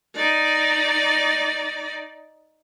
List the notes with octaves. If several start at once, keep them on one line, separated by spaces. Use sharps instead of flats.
D#4 D5